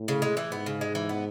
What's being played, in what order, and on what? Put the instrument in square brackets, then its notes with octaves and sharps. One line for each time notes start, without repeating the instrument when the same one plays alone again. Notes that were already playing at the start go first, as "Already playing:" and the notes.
Already playing: [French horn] A2
[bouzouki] C#3
G#3
E3
[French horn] G#2 [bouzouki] B3
[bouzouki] C#3
G#3
E3
B3